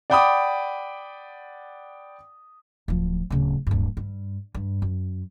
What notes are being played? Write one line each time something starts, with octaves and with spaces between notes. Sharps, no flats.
D5 F#5 G5 B5 D6 D#6
D1 F3
D1 C#3
D1 G2
G2
G2
F#2